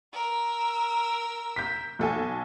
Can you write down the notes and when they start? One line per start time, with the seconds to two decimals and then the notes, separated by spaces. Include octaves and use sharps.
0.14 A#4 E6
1.56 G6 B6
1.99 B1 A4 G#5